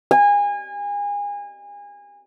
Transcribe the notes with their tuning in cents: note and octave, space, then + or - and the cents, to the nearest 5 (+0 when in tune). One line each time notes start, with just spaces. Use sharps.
G#5 -30